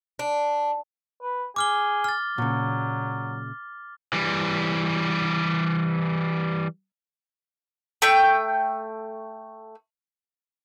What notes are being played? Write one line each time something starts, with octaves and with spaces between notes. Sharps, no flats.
D4
B4
G#4 D6 F6 G7
F6 A6
A#2 C#3 F#3
E3 G3
A3 G5